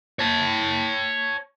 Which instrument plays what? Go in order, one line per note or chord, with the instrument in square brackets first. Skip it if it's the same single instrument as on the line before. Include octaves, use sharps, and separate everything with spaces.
[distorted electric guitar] C#5 A5